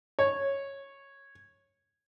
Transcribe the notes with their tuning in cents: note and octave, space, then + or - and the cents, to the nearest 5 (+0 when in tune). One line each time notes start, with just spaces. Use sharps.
C#5 -10